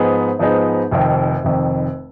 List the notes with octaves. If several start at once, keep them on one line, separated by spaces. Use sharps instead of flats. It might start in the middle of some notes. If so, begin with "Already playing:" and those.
Already playing: G#2 F3 B3 D#4 G#4
G#2 F3 B3 D#4 G#4
F1 F2 D#3
F1 F2 D#3